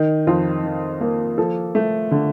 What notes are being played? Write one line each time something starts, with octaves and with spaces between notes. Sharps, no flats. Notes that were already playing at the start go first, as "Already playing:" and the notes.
Already playing: D#3 D#4
F2 F4
D#3
A#3
F3 A4
A3
D3